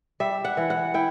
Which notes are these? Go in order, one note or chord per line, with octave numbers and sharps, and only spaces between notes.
G3 E5
F#5
E3
F#5
E4 G5